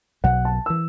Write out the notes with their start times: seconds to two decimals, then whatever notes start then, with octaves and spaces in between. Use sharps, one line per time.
0.24 B1 B2 F#3 F#5
0.45 A5
0.66 E3 E6